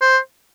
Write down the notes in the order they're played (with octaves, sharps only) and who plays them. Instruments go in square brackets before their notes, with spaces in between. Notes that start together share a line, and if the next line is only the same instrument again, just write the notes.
[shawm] C5